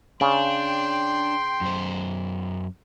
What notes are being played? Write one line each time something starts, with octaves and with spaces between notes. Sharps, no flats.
C#3 D4 G5 C6
F#2 C5